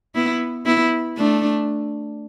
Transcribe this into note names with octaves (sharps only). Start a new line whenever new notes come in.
B3 E4
B3 E4
A3 D4